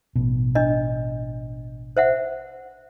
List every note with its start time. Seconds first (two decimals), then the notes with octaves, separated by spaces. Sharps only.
0.15 A1 B2
0.55 D4 D#5
1.97 C5 E5 F#5